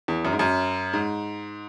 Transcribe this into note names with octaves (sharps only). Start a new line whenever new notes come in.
E2
F#2
G#2
F#2
G#2